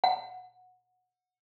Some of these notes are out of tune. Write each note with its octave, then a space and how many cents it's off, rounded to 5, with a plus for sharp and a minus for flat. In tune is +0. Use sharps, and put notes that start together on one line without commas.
F#5 -20